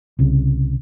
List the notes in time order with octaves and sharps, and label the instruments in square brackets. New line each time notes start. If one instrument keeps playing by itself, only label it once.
[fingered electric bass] C2 C#3